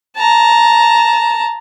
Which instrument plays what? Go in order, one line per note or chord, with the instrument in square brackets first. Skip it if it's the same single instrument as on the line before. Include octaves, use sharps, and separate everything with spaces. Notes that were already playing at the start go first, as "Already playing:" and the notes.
[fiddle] A5 A#5